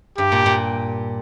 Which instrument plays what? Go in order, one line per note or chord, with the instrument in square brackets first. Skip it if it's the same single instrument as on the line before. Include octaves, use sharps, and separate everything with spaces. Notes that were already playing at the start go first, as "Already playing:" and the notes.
[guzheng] G2 [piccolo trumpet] G4
[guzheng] A#2
A#2